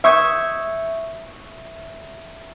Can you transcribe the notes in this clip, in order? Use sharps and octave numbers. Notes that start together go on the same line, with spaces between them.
E5 C#6 D#6 G6 G#6